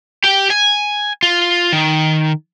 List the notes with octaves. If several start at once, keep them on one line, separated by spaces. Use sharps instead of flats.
G4 G5
G#5
F4
D#3